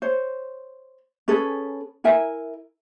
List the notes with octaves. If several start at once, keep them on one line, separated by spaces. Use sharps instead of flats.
C5 C#5
C#4 G#4 A4 B4
E4 A#4 E5 G#5